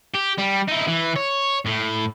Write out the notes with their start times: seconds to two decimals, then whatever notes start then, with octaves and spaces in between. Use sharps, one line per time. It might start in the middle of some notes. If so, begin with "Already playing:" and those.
0.15 G4
0.38 G3
0.68 D#4 E4
0.88 E3
1.16 C#5
1.66 A2